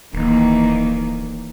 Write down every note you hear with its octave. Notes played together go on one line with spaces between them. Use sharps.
D1 D#3 E3 A#3